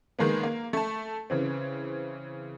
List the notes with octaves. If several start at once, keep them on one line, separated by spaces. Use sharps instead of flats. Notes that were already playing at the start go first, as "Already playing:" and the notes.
D#3 G#3 A#3 B3
A#3
A3 A5
C#3 E3 C4